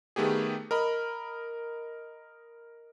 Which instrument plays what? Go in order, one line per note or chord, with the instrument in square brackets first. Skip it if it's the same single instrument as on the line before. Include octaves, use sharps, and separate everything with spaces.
[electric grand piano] D#3 A3 B3 G4 G#4
A#4 D#5 B5